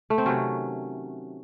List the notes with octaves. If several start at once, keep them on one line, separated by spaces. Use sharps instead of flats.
A3
C4
C3 D#3 F#3 C#4